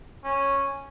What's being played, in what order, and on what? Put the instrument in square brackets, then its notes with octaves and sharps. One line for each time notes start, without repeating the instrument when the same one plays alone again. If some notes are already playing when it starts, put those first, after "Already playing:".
[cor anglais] C#4